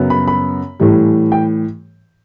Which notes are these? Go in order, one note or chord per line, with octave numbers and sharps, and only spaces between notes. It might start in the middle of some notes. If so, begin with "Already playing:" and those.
Already playing: F#2 C#3 F#3 B3
B5
B5
A2 E3 G3
G5